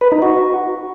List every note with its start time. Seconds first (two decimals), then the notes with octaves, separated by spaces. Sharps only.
0.01 B4
0.12 D#4
0.22 F#4